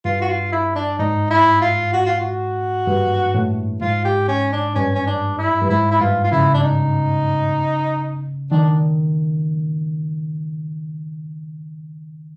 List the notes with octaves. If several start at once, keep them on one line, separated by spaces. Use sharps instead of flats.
G2 F4
F#4
F4
E4
D4
G#2 D#4
E4
F4
F#4
F4
F#4
G2
A2
G#2 F4
G4
C#4
D4
G2 C#4
C#4
D4
E4
G2
G#2 E4
E4
G2 F4
F4
C#3 E4
D4
D#4
D#3 D4